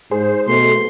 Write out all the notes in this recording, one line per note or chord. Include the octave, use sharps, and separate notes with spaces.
G#2 G#4 C5
B2 A3 C6